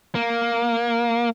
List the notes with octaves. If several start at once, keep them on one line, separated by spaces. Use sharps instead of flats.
A#3